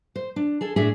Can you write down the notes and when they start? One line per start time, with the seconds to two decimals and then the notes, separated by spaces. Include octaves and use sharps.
0.16 C5
0.36 D4
0.61 G#4 A4 A5
0.76 A2 D4 G#4 E5